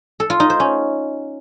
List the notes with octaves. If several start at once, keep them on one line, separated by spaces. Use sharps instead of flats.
A4
F4
D#4
C5
C#4